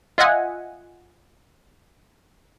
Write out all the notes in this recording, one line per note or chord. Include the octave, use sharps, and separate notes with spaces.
F4 D#5 E5 F#5 G#5